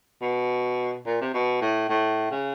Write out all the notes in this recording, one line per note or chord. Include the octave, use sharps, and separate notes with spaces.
B2
A#2
C3
B2
A2
A2
C#3